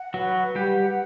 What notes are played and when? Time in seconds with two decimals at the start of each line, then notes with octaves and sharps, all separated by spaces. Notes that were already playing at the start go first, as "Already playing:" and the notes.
Already playing: F#5
0.14 F#3 F#4 B4
0.35 B4
0.55 G3 G4 F#5
0.77 F#5